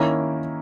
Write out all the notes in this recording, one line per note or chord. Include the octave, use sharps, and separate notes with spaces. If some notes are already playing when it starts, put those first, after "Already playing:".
Already playing: D#3 A#3 C#4 E4 A#4